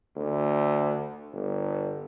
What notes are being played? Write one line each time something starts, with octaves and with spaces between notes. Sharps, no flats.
D2
G1